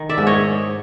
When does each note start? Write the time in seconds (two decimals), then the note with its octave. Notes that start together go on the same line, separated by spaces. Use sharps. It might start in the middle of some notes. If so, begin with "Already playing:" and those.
Already playing: D#3
0.09 D5 E5
0.18 G#2
0.27 C#5 D#5